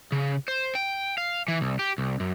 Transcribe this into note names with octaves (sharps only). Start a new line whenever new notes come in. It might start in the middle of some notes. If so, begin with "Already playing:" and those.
C#3
C5
G5
F5
E3
C2
G4
C2
F#2